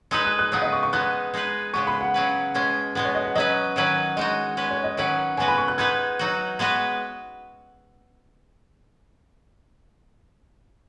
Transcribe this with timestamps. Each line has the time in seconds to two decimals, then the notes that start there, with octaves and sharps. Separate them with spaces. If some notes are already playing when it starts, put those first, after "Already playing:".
0.11 G#3 D#4 B4 D#6
0.25 F#6
0.39 F#6
0.52 C#3 B3 D#4 D#6
0.62 D#5
0.73 C#6
0.83 C#6
0.93 G#3 B3 D#4 F#6
1.34 G#3 D#4 G#4 B4
1.74 C#3 G#3 B3 C#6
1.87 B5
2.01 F#5
2.14 C#3 F#3 C#4 B4
2.54 B2 G#3 C#4
2.95 B2 G#3 B3 F#5
3.05 C#5
3.15 D#5
3.25 F#5
3.35 F#3 C#4 B4 D#5
3.76 D#3 F#3 C#4 B4
4.16 G#3 D#4 F#4 D#5
4.57 G#3 C#4 B4
4.71 C#5
4.84 D#5
4.97 D#3 F#3 C#4 B4 F#5
5.37 C#3 G#3 B3 F#4 B4 G#5
5.48 B5
5.58 C#6
5.68 F#6
5.78 G#3 B3 D#4 B4 G#6
6.19 F#3 D#4 F#4
6.59 G#3 B3 F#4 B4